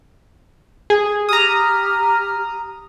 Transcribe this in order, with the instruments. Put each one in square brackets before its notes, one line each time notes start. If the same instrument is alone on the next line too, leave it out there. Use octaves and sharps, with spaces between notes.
[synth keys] G#4
[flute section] G4 F6 [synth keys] A#5 D#6